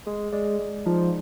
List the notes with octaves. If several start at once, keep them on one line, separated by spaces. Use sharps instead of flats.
G#3 G#4
G#3 D5
G#3
F3 D#4